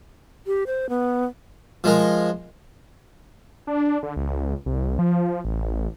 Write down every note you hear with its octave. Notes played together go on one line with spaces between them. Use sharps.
G4
C5
B3
F3 G#3 A#4
D4
D3
C#2
C2
F3
A1